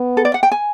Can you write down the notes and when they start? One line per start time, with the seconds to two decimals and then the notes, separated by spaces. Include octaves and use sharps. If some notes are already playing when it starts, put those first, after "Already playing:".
Already playing: B3
0.17 A4
0.25 D5
0.34 F#5
0.43 G5
0.52 G#5